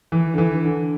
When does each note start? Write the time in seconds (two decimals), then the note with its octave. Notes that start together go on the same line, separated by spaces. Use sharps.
0.12 E3
0.34 D3
0.38 E3
0.64 D3